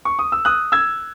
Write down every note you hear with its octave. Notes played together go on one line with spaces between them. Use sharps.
C#6
D#6
E6
D#6 F#6
E6 G#6